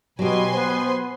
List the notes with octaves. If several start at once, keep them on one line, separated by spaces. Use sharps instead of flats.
B2 F#3 G4 B4 G#5 C6
B3 C5